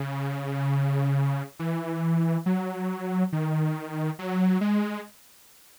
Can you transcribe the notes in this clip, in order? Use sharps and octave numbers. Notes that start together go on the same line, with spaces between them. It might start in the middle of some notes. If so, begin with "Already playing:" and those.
Already playing: C#3
E3
F#3
D#3
F#3
G#3